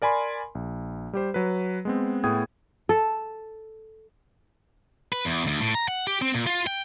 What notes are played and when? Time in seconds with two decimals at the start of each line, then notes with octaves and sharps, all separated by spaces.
0.02 A#4 D5 G#5 B5 C6
0.55 A#1
1.13 G3 G4 C5
1.34 F#3 B4
1.85 G#3 B3 C4
2.24 A2 B3 G#4 G5 D#6 G#6
2.89 A4
5.12 B4
5.25 E2
5.47 D2
5.60 A2
5.75 A#5
5.88 F#5
6.07 G4
6.22 C4
6.35 A#2
6.47 F4
6.67 G5